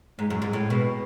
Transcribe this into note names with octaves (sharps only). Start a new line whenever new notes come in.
G#2 G#3
F#2
G#2
A2
B2